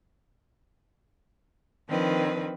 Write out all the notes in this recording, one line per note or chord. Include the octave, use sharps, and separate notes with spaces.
D#3 F3 C4 D4 B4